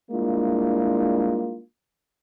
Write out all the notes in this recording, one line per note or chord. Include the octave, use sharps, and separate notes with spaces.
G3 G#3 A#3 D4 E4 F4